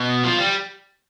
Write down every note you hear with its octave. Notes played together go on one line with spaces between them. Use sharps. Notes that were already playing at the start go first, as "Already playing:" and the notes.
Already playing: B2
F3
G3